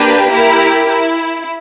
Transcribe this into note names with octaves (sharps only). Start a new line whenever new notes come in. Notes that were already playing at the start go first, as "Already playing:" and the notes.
Already playing: A#3 D4 G4 B4
E4 G4 A#4
E4